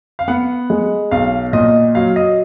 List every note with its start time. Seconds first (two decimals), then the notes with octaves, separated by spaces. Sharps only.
0.19 F5
0.28 B3 F#5
0.70 G#3
1.11 B1 F5
1.53 A#2 D#5
1.95 F#3 F5
2.16 D#5